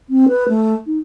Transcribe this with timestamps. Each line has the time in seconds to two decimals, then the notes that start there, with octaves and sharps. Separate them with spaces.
0.10 C4
0.29 B4
0.49 A3
0.86 D#4